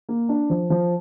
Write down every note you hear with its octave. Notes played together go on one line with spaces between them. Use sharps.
A#3
D4
F3
F3